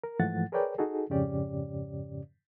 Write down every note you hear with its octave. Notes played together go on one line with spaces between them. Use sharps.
A#4
G#2 E3 F3 A3 F#5 A6
G#4 A#4 B4 C#5 D5 G5
D#4 F#4 G#4 A4
F2 G#2 C#3 C#4 G4 D5